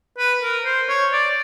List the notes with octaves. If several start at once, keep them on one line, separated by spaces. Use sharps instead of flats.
B4
A#4
C5
C#5
D5